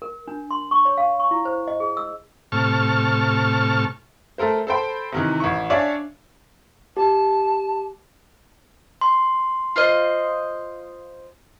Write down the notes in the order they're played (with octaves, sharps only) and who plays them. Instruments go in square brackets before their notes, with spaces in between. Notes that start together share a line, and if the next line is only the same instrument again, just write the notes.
[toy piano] A#4
D4
C6
C#6
C#5
F5
C#6
E4
C5
D#5
G#4
E6
[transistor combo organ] A2 C3 A5 C#6 F6
[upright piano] A3 A4 A#4 C5
A4 C5 G5 B5
C3 D#3 E3
A1 E4 C#6
D4 C#5 D5 E5 F5 G#5
[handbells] G4 [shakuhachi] A5
[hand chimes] C6
[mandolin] F4 C5 D#5